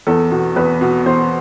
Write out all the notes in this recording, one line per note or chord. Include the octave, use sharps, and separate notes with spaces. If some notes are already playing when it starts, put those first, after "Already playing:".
E2 A4
B2
E2 B4
B2
E2 C5